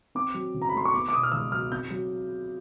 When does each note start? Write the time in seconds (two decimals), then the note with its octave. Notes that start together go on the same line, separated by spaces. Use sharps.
0.15 C4 D6
0.34 F#3
0.54 C#3
0.62 A#5
0.69 B5
0.74 A3 C6
0.85 C#6
0.94 B3 D6
1.09 D6
1.13 B2 D#6
1.23 F6
1.32 C#2 E6
1.52 F#3 F6
1.72 C4 G6
1.91 F#3